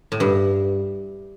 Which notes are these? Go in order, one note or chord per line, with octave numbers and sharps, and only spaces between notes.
A2
G2